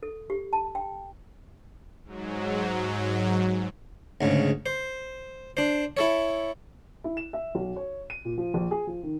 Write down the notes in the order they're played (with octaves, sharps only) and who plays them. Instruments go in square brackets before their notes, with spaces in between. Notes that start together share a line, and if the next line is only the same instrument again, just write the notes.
[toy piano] A4
G4
A5
G5
[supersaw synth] G#2 F#3
[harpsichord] D2 G#2 C#3
C5
D4 C5
E4 A4 C#5
[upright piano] E4
E7
E5
B1
C#5
D#7
A#2
F3
A#1
G#4
F3
D#3